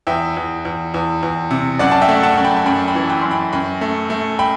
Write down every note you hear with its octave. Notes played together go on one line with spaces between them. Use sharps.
E2 E5 G5
E2
E2
E2
E2
C3
F#2 D5 F#5
A5
E5 G5
A3
F#5 A5
F#2
G5 B5
A5
F#2 G5 B5
G5 B5
E3
G5 B5
F#2 C6
G5 B5
F#2 G5 B5
A3
A3
G5 B5